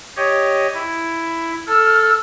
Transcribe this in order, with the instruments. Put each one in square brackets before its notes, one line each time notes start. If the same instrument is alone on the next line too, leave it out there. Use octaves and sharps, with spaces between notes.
[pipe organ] G4 C#5 D#5
E4
[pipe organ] A4 [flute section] E6 F6